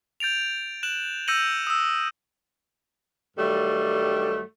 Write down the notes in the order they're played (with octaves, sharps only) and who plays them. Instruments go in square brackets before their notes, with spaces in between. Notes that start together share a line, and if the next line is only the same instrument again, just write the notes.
[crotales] G6 A6 D7 F7
F#6 E7 F#7
E6 G6 A#6 C#7 D#7 F#7
D#6 E6
[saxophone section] G2 D#3 F#3 G3 A3